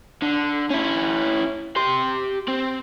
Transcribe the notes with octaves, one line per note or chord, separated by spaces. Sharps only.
D3
C#4 E4
G4 C6
C4